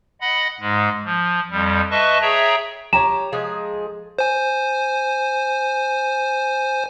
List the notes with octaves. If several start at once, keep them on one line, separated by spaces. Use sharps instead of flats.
D#5 F#5 B5
G#2 G#3
F3
F2 G3
B4 D#5 E5 A5 C#6
G#4 C#5 E5 G5 A#5
G4 C#5 A#5 E7
F3 G#3 G#4
C5 G#5